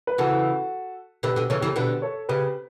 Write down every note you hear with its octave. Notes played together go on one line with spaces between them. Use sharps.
B4
C#3 E3 F#4 A4
B2 D3 G4 B4
B2 D3
C#3 E3 A4 C#5
C#3 E3 G4
A4
B2 D3 G4 B4
A4 C#5
C#3 G4 B4